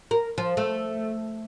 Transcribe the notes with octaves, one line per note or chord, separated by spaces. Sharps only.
A#4
F3
A3